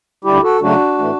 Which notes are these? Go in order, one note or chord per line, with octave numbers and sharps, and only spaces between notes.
D2 D3 G3 E4 G4
F#4 A4
C#3 F#3 A3 C#4 D4 F#4
A2 E3 A3